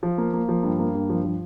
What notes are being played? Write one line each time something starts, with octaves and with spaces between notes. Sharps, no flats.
F3
A#3
A#3
F3
G2
A#3
G2
F3
F3